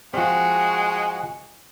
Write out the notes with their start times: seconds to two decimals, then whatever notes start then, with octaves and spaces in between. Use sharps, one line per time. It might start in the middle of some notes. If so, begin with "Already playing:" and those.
0.14 F3 G#3 C4 F#4 G#5